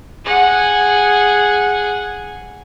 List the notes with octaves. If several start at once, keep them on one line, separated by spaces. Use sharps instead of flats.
G#4 F#5